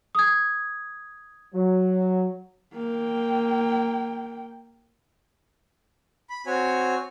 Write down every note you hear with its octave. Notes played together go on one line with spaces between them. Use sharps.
D#6 G#6
F#3
A#3 G5
B5
C4 F#4 C#5 G#5